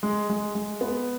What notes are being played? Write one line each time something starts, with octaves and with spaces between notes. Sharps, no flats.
G#3
G#3
G#3
B3